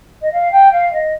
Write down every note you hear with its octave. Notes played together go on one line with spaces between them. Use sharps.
D#5
F5
G5
F5
D#5